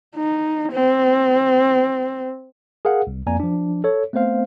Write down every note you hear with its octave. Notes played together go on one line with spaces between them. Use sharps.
D#4
C4
G#4 A#4 F5 F#5
C2
F2 A#3 D5 G#5 A#5
F3 D4
A4 C#5
A3 B3 C4 C5 F5